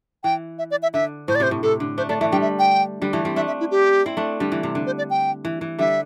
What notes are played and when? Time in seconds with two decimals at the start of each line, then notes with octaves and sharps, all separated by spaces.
0.24 E3 G5
0.59 E5
0.71 D5
0.83 E5
0.94 D3 E5
1.28 A2 C5
1.35 D5
1.40 C3 C5
1.51 A2
1.63 C3 A4
1.80 D3
1.98 A3 D4 C5
2.09 A3 D4 D5
2.21 E3 A3 E5
2.32 D3 G3 G5
2.41 E5
2.59 G5
3.02 D3 G3
3.13 E3 A3
3.25 G3 C4
3.36 A3 D4 E5
3.47 E5
3.60 E4
3.71 G4
4.06 C4 E4
4.17 A3 D4
4.40 D3 G3
4.52 E3
4.63 C3
4.75 D3
4.86 C5
4.98 D5
5.10 G5
5.45 E3
5.61 E3
5.79 D3 G3 E5